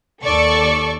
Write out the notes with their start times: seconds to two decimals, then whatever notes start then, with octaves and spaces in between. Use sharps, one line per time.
0.23 D#2 A4 D5 C#6